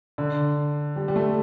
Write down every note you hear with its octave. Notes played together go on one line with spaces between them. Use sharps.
D3
G3
G3
A3